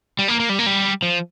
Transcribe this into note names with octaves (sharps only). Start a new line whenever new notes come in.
G3
A#3
A#3
G3
A#3
G3
F3